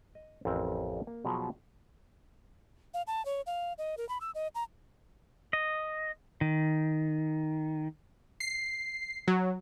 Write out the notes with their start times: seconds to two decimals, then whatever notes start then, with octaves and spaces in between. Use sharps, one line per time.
0.15 D#5
0.45 A1 F2 C4 A#4 C5 G#5
1.07 A#3
1.25 B2 F3 F#3 G4 G#4
2.94 F5
3.07 A5
3.25 C#5
3.47 F5
3.78 D#5
3.97 A#4
4.09 B5
4.21 E6
4.35 D#5
4.55 A#5
5.53 D#5
6.41 D#3
8.40 C7
9.28 F#3